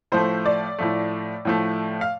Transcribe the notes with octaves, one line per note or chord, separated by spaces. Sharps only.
A2 F3 A3 C5
D5
A2 F3 A3
A2 F3 A3
F5